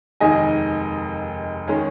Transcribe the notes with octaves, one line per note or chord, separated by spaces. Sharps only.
F1 D#2 D#3 G#3 D#5 G#5
D#3 G#3 C#4